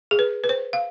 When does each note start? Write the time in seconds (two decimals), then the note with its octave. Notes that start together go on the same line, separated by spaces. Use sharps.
0.11 G#4
0.19 B4
0.44 B4
0.49 C5
0.73 F5